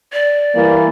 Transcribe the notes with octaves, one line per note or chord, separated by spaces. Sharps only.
D5
E3 G3 A#3